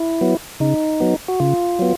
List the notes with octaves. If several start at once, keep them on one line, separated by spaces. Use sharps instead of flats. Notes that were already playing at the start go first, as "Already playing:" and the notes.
Already playing: E4
F#3 B3
C#3 D#4
F#3 B3
F#4
C#3 F4
F#3 B3